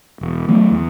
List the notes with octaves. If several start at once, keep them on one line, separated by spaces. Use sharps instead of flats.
E1
D#3 F#3 A3
E2